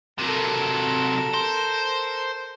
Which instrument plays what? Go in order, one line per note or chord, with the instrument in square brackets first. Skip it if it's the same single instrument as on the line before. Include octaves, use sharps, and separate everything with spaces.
[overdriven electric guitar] C3 F#3 [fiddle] A4 A#4
[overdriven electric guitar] C5